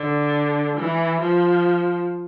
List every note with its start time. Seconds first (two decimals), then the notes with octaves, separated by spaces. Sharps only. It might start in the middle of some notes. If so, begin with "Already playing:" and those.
Already playing: D3
0.77 E3
1.21 F3